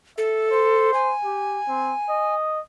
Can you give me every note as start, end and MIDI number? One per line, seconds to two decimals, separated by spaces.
0.18 0.93 69
0.18 0.48 76
0.51 1.13 72
0.94 2.35 80
1.24 1.60 67
1.68 1.93 60
2.09 2.60 75